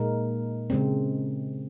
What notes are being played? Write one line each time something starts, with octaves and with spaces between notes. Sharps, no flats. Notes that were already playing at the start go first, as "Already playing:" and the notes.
Already playing: A#2 G#3 D#4 A#4
C#3 G#3 C4